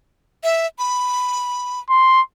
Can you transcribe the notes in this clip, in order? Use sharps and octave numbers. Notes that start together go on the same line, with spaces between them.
E5
B5
C6